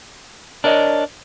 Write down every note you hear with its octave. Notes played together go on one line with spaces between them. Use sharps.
D4 A#4 C#5 D#5